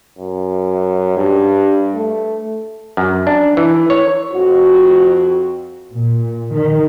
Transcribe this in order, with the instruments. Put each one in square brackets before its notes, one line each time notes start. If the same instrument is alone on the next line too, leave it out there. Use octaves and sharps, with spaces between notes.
[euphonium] F#2
G2
A3
[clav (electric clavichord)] F#2
D4
E3
C#5
[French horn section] F2 F#4
[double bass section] A#2
D#3